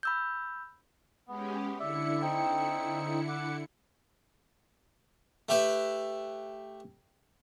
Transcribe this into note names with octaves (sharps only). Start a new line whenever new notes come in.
B5 E6 G6
G#3 B3 C#4 G4
D3 E4 D5 E5 C#7
C4 D#4 G5
F#5 D6
A3 G4 B4 E5